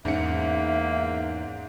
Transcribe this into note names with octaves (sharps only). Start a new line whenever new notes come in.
E2 G#2 A#3 C#4 E5 C#7